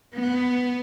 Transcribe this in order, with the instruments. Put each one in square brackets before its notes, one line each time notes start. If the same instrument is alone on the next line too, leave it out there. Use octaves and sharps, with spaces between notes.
[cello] B3